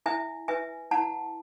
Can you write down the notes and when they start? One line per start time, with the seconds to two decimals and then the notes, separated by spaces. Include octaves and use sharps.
0.06 E4 E5 G#5
0.48 B4 E5 G#5
0.91 E4 F#5 A5